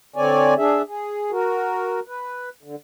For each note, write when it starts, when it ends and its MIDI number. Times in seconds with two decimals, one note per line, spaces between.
0.16 0.54 50
0.16 0.54 60
0.16 0.54 73
0.16 0.54 74
0.16 0.54 80
0.57 0.82 62
0.57 0.82 68
0.57 0.82 76
0.88 1.31 68
1.31 2.00 66
1.31 2.00 70
2.08 2.49 71
2.63 2.76 50